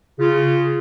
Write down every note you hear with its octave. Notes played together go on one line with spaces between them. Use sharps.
C#3 F4